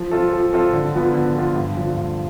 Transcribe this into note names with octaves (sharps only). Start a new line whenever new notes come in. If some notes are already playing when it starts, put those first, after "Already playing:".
Already playing: F3
C4 F4 A4
F3
C4 F4 A4
D3
F3 B3 F4
D3
F3 B3 F4
G2
D3 F3
G2